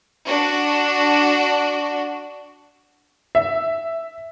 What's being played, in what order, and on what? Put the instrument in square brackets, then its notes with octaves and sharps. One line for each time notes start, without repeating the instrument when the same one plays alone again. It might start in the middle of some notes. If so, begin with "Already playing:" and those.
[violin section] D4 F#4
[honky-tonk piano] E5